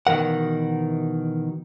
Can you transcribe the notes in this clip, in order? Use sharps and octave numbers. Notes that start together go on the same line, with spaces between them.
B2 D#3 E3 A#4 F#5